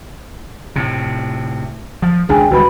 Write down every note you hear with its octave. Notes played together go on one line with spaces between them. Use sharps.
A2 C3
F3
G#1 C#2 D4 G#4 G5 G#5
G#1 C#2 G3 F#4 B4 B5